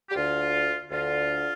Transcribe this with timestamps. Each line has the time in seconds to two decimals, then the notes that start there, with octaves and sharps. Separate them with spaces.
0.10 G4
0.14 D2 D3 F4
0.90 D2 D3 F4